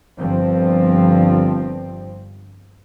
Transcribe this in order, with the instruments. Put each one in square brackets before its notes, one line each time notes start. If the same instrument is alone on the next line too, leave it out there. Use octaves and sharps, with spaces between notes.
[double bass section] G1 G2 F3 C4